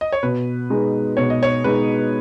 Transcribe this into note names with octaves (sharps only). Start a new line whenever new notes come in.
D#5
C#5
B2 B4
G#3 B3 D#4
B2 C#5
D#5
C#5
G#3 B3 D#4 B4